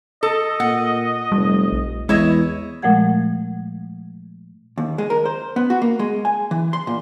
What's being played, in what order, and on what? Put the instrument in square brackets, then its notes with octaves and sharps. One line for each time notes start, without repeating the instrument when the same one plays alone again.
[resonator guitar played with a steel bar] A4 [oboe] D#5
[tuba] A#2 [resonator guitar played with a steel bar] F#5
[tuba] F1 [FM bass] G3
[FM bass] A#1
[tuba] E2 [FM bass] G#3 [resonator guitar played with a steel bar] E4 C#5 D#5
[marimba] A#2 F3 G#3 A3 F#5 G#6
[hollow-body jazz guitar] D#2
G#3
A#4
C5
B3
F#4
A#3
G#3
G#5
E3
C6
A#2